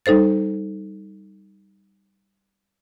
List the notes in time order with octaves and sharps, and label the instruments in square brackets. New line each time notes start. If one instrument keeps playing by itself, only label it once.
[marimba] G3 D#4 A4 C5 A6